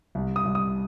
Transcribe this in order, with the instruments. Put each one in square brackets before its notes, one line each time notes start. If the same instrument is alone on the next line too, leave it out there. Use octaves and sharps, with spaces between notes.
[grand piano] C2
D#6
C2
D#6